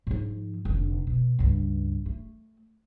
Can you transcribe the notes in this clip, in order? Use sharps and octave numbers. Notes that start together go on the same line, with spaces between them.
G#2 F3
F1 D3
B2
C#2 G2
A3